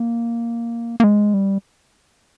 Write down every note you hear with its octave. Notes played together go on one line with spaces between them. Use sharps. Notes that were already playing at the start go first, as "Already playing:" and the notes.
Already playing: A#3
A#3
G#3
G3